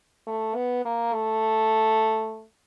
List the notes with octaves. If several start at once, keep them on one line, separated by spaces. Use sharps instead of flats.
A3
B3
A#3
A3